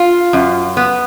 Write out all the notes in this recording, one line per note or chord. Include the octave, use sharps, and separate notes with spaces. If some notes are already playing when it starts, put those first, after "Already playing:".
Already playing: F4
F#2
B3